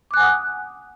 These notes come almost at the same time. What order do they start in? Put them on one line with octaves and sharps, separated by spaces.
D6 F#6 G#5 F#5 D#6